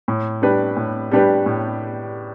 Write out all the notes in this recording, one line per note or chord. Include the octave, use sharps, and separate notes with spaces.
A2
G3 D4 G4 B4
A2
G3 D4 G4 B4
A2